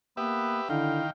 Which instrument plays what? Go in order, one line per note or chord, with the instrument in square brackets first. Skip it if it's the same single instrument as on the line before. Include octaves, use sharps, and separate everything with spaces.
[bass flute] A#3 [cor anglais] B3 [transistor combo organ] G4 B4 E5
[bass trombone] D3 [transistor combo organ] D#3 G5 [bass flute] E4 [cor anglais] F5